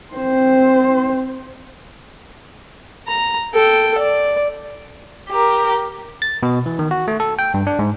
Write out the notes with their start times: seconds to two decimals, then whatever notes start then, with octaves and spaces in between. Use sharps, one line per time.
0.14 C4 C5
3.07 A#5
3.54 A4 G5
3.98 D5
5.29 G4 A#4
6.22 A6
6.43 B2
6.66 E3
6.79 D#3
6.91 F#4
7.08 A3
7.20 A4
7.39 G5
7.54 G2
7.67 D4
7.79 G#2